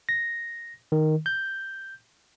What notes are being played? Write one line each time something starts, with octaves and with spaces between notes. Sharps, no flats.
A#6
D#3
G6